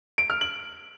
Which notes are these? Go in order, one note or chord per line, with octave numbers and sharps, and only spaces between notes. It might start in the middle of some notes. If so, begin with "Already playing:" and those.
D7
F6
F#7